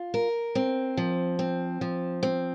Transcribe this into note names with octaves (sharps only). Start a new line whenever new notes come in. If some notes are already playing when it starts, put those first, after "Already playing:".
Already playing: F4
A#4
C4
F3
C4
F3
C4